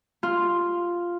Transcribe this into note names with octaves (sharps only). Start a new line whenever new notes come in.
F4